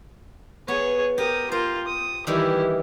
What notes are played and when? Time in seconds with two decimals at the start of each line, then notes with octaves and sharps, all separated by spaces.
0.68 B3 G#4 C#5
1.18 G4 A#4 D#6
1.52 F4 A#4 C5
1.87 D#6
2.27 D#3 E3 G3 E4 G4